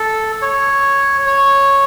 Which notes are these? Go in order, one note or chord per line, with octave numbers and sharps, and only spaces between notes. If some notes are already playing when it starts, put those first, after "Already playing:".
Already playing: A4
C#5
C#5